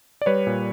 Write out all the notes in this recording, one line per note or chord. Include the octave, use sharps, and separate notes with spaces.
D5
G3 B4 C#5
A#2